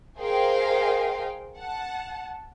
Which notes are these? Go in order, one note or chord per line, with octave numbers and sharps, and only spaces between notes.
G#4 A#4 C5 D#5 F5 G5
F#5 A5